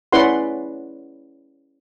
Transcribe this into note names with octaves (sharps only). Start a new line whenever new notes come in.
C#4 E4 B4 D5 F#5 C6